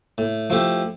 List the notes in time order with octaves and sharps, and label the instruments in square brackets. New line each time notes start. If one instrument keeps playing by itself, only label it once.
[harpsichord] A2
F3 A3 E4 G4